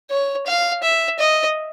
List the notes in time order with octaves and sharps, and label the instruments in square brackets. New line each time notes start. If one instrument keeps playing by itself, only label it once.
[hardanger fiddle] C#5
F5
E5
D#5